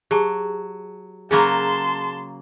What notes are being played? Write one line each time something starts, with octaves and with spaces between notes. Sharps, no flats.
F#3 G4 G#4 A5
C#3 F#3 A#3 G#4 A5 B5 C6